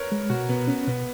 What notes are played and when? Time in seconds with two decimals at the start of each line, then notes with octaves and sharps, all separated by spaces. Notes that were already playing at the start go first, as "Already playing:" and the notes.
Already playing: A#4 B4 C#5
0.12 G#3
0.30 B2 F#4
0.49 B2 B3
0.68 B3 C#4
0.87 B2 B3